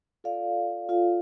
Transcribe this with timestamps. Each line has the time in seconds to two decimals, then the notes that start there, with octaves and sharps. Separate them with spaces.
0.24 F4 A4 D5 F5
0.89 F4 A4 D5 F5